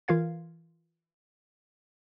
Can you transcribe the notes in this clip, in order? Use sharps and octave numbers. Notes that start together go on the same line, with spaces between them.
E3 F4 A#4 F5 G#6